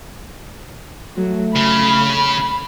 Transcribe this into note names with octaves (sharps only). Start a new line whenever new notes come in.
F#3 A3
C#3 B5